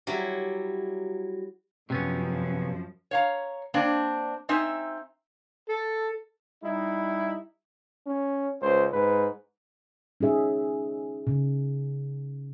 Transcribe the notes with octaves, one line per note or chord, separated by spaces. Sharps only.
F#3 G3 E4
F#2 C3 F3 B3 C#4
C#5 F5 A#5
A#3 C4 D4 D5
C4 D#4 E5 G#5
A4
G3 D#4 E4
C#4
C#2 C5
G#2 B4
C#4 D#4 G#4 E5
C#3